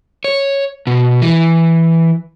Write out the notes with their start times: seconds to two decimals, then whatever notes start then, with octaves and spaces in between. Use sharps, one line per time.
0.24 C#5
0.87 B2
1.22 E3